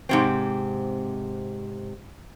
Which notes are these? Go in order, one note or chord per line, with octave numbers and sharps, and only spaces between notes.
G#2 C3 C4